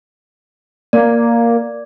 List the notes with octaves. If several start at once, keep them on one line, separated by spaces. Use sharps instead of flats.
A#3 D5